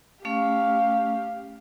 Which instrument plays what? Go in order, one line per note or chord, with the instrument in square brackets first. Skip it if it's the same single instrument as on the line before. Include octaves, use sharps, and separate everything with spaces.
[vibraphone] A3 C#4 [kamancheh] G4 F5